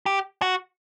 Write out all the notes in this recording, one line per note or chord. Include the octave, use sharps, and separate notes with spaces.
G4
F#4